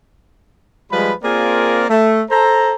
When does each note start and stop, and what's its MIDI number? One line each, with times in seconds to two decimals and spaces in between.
0.92 1.12 53
0.92 1.12 55
0.92 1.12 56
0.92 1.12 71
0.92 1.12 83
1.23 1.85 58
1.23 1.85 60
1.23 1.85 65
1.23 1.85 68
1.23 1.85 70
1.23 1.85 74
1.90 2.22 57
2.30 2.75 69
2.30 2.75 72
2.30 2.75 82